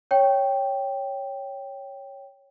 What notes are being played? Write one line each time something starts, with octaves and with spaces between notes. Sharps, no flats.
C#5 G5